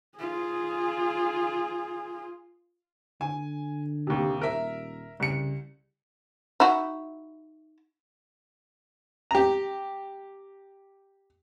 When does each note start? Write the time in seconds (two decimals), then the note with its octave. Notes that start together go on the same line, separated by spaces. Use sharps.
0.18 F4 G#4
3.21 D3 G#5
4.07 D#2 C3
4.41 D#1 A#4 E5
5.20 C2 C#3 C#7
6.60 D#4 E4 F#4
9.31 G4 A#5